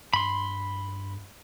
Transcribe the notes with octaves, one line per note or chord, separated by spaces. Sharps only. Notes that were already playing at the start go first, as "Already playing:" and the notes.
G2 B5 C6